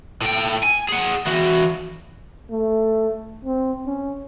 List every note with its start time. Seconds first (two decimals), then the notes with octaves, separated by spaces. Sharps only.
0.22 A2 G5
0.63 G#5
0.89 G#4 F#5
1.27 E3 F#4
2.50 A3
3.45 C4
3.86 C#4